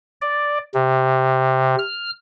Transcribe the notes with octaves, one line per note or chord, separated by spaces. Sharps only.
D5
C3
F6